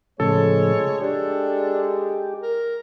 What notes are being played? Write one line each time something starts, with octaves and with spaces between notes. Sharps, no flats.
A2 C#3 F3 G#3 A4 C#5
G#3 D4 G4
A#4